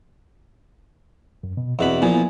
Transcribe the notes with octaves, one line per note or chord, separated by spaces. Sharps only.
F#2
B2
E2 B2 C4 F#5 B5
A#2 F3 B3 E4 G#5